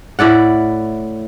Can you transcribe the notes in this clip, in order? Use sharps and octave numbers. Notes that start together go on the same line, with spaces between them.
A2 E4 D5 F#5